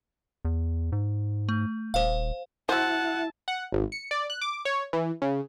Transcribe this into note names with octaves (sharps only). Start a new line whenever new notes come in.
E2
G#2
A3
D#1 C5 F5
F#3 E4 C5 F#5 A5
F#5
G#1
C#7
D5
F#6
D6
C#5
E3
C#3